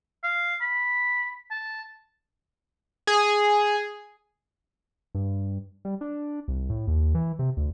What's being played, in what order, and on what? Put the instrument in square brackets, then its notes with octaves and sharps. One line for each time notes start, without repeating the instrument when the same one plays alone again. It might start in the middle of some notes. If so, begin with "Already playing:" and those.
[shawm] F5
B5
A5
[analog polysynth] G#4
[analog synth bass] G2
G3
D4
C2
A2
D#2
E3
C3
D2